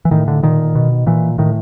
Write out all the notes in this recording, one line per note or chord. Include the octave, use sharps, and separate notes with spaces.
E3
A2 D#3
D3
A#2 D#3
B2
A#2 E3
A2 D#3